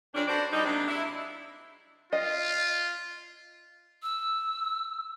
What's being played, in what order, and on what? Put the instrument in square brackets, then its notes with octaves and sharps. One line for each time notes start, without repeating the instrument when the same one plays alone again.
[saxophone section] F2 C#4 D4
F#4 A4 B4 C5 D5
G3 D#4
C3 F#3 G#3 A#3 C4 D4
E4
[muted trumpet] F4 [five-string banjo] D#5
[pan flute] E6